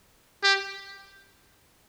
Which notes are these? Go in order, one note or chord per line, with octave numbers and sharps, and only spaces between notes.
G4